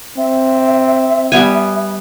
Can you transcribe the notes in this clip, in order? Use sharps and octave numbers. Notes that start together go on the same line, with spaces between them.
C4 E5
G3 B3 G#5